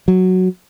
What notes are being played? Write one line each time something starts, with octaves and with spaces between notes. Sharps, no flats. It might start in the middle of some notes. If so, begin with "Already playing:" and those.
F#3